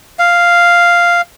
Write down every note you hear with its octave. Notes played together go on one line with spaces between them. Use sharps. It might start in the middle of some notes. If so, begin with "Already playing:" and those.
F5